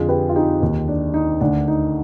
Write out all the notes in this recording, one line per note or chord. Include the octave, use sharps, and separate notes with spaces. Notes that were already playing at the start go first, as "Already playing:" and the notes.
Already playing: F2 D3 F4 G#4
G4 B4
F4
D#4 G4
D#2 D#3
D4
D#4
D2 D3 D4
D#4